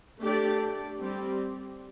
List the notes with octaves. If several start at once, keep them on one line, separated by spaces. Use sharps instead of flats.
A3 D4 G4 D5
G3 C4 G4